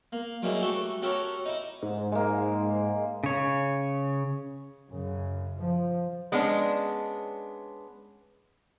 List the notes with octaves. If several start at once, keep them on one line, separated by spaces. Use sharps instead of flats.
A#3
F#3 G3 A#3 D#4 E4 G#4
A3 F#4 G4 A4
C#4 F#4 G4 A4 A#4 C#5
D#4 E4
G#2
G#3 A#3
C#3 C#5
F#2 C#3
F3
G#3 B3 C#4 D4